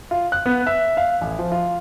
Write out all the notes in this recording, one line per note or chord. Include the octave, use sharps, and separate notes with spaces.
F4
F#6
B3
E5
F5
A1
F3
F4